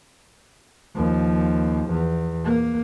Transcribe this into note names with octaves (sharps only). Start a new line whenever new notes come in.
D#2 F3
E2
A#3